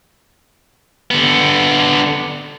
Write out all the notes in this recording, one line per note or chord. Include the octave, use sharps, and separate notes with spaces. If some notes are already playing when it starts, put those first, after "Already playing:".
D3 B3